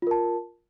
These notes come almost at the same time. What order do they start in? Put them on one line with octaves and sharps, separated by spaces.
F4 A#4 A5